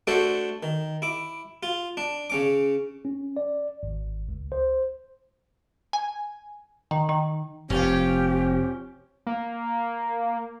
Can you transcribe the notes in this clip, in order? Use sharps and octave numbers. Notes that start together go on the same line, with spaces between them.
A3 D4 F#4 A4 C5 C#5
D#3
E4 D6
F4
D4
C#3 C#4 D6
C#4
D5
G#1
C#2
C5
G#5
D#3
D#3
F1 C4 C#4 F4 G4
A#3